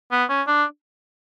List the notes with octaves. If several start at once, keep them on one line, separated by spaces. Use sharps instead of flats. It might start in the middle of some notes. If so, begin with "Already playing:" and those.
B3
C#4
D4